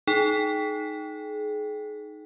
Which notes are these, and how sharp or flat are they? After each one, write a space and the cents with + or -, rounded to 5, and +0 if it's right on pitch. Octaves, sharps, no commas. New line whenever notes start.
D#4 +0 G#4 +35 G5 +0